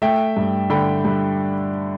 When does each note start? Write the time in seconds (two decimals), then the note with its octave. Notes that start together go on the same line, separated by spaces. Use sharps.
0.02 A3 E5 G5
0.37 G2
0.70 D3 G5 B5
1.05 G2